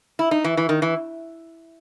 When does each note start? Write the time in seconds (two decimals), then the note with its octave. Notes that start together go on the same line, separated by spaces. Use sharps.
0.19 E4
0.31 D#4
0.44 E3
0.57 E3
0.69 D#3
0.82 E3